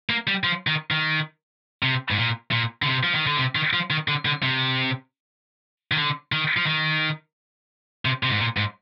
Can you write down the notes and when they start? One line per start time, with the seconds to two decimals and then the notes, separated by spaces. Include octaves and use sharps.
0.10 A#3
0.27 G3
0.44 F3
0.67 D#3
0.91 D#3
1.83 C3
2.11 G#2
2.18 A#2
2.51 A#2
2.82 D3
2.86 C3
3.03 F3
3.15 D#3
3.27 D3
3.38 C3
3.55 D#3
3.73 F3
3.90 D#3
4.08 D3
4.25 D3
4.43 C3
5.92 D#3
5.98 D3
6.32 D#3
6.57 F3
6.67 D#3
8.05 C3
8.23 C3
8.31 G#2
8.40 A#2
8.57 G#2